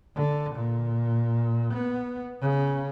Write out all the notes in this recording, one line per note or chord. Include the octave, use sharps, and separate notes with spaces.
D3
A#2
B3
C#3